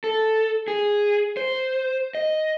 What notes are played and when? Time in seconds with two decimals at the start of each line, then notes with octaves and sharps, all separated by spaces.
0.04 A4
0.68 G#4
1.37 C5
2.15 D#5